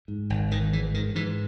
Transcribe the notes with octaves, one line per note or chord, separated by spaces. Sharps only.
G#2
G#1
G#1 D#3
G#2 E3
G#2 D#3
G#2 E3